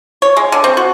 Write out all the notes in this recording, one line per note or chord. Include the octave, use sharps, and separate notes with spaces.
C#5
G#3
D3
C4
F#4